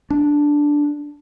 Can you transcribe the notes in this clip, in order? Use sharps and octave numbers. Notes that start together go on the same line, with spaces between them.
D4